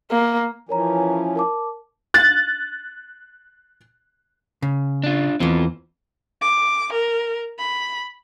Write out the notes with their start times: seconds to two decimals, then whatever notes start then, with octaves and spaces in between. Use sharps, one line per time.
0.11 A#3
0.69 E3 F3 C#4 A#4 C#5 A#5
1.36 A#4 A5 D6
2.14 F#6 A6
4.62 C#3
5.04 D4 F4
5.40 E2 E3 C4 F4
6.41 D6
6.92 A#4
7.58 B5